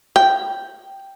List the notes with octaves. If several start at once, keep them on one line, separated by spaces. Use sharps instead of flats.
G5